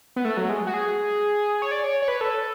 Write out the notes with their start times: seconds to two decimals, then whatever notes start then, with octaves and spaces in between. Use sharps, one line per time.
0.16 B3
0.25 A3
0.37 F#3
0.49 G#3
0.67 F#4
0.74 G#4
1.62 C#5
1.71 D5
1.84 C#5
2.02 C#5
2.08 B4
2.21 A4